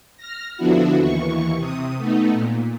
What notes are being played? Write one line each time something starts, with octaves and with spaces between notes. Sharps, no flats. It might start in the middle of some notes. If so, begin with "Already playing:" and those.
F6 A#6
D3 F3 B3 D4 E4 F#4
D#2 E3 C#6
C3 D#6
A3 B3 D#4
A#2